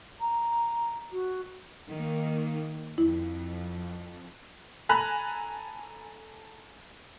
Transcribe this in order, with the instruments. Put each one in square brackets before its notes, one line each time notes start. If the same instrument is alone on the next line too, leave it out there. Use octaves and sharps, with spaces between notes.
[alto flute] A#5
F#4
[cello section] D#3 A#3
[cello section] F2 [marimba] E4
[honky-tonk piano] A4 G#5 A#5 B5 F#6